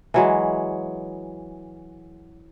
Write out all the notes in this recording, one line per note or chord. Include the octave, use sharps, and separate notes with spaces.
E3 F#3 G#3